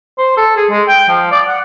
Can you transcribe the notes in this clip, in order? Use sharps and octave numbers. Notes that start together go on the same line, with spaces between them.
C5
A4
G#4
G#3
G5
F3
D5
F#5